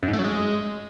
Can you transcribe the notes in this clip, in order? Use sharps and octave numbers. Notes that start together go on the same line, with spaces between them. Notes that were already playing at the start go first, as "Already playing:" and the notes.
F#2
G#2
A3
F#3
G#3